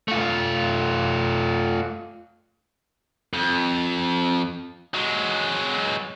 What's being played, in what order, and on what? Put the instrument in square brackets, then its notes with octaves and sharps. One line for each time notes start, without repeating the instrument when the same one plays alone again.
[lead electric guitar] A3 F4
[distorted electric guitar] F2
F#3 G#3